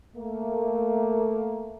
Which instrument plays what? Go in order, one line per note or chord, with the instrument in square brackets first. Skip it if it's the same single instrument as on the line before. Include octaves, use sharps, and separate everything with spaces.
[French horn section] A3 A#3